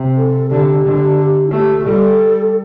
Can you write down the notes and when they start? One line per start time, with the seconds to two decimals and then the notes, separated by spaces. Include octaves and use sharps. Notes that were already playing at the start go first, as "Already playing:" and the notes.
Already playing: C3
0.17 A4
0.50 D3 G4
0.84 D3
1.18 G4
1.47 E4
1.52 A3 G4
1.78 G4
1.86 G3 A4